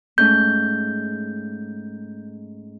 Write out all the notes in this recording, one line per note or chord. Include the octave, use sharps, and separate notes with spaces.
G#2 A3 C#4 G6